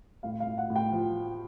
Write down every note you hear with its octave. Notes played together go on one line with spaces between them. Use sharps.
A2 F5
F5
A2
F#5
A2
G5
F3